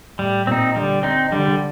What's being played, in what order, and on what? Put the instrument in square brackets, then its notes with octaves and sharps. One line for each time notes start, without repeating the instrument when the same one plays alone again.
[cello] A2 [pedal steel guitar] G3
[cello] A#2 [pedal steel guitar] C4
[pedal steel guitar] D#4
[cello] D3 [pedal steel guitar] G3
[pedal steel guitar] C4 D#4
[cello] D3 [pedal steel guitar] G3